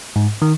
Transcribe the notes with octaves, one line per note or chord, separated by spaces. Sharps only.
G#2
D#3